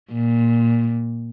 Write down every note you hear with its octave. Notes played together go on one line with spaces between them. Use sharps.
A#2